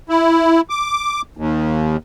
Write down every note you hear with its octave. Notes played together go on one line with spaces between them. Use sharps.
E4
D6
D#2